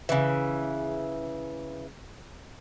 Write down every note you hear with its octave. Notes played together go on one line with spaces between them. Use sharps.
C#3 E3